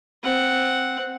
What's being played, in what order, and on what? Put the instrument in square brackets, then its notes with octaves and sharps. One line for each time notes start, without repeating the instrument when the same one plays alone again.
[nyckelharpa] C4 F#5